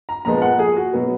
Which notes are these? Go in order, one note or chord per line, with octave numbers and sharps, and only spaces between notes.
A#5
A#2 F3 G#3 B3 A#5
F#5
G#4
F#4
B2 F#3 B3